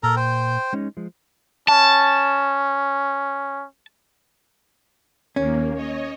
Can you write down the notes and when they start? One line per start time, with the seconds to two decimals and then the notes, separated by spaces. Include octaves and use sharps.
0.03 A#2 A4 A#4 A#5
0.16 C5 G5
0.73 G#3 C#4 D#4
0.97 F3 G#3
1.68 C#4 A5
5.36 D#2 A#3 C#4
5.75 C#5 D#5